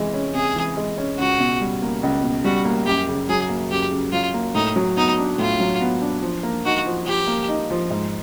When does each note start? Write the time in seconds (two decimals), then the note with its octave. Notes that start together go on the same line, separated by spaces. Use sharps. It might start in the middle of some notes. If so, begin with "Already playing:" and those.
Already playing: C3 E3 G#3
0.14 C#4
0.34 C3 G#4
0.56 E3
0.77 G#3
0.98 C#4
1.19 C#2 F#4
1.40 B2
1.60 G3
1.82 A#3
2.03 C#2
2.23 B2
2.44 G3 F#4
2.65 A#3
2.86 F#2 G4
3.08 C#3
3.29 F#3 G#4
3.49 A#3
3.71 F#2 G4
3.91 C#3
4.12 F#3 F4
4.34 A#3
4.55 A2 D#4
4.76 F#3
4.97 B3 D#4
5.18 D4
5.38 A2 F4
5.60 F#3
5.81 B3
6.02 D4
6.22 F3
6.43 A#3
6.65 D#4 F#4
6.86 F3
7.06 F3 G4
7.27 A#3
7.48 D#4
7.70 F3
7.91 G#2